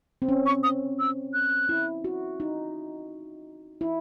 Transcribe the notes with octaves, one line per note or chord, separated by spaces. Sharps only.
C4
C#4
C#6
D#6
E6
F#6
E4
F#4
D#4
E4